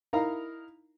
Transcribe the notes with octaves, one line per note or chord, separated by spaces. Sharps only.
D#4 E4 A#4 F5 A#5